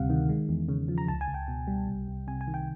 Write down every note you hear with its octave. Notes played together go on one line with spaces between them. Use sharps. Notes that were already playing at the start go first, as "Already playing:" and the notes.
Already playing: D2 C3 G3 F5 F#5
D#3
G#3
E2
C#3
F3
A#5
C#2 A5
G#5
C#2
G5
B2
G3
C2
C2
C3 G#5
G#5
D#3
G5